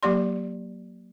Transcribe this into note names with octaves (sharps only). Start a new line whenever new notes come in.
F#3 A#3 G4 D5 C6